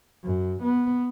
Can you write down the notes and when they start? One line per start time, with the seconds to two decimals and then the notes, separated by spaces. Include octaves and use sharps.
0.24 F#2
0.62 B3